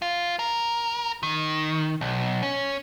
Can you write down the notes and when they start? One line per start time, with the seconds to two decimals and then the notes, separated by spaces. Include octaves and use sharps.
0.02 F4
0.39 A#4
1.23 D#3
2.01 B1
2.43 C#4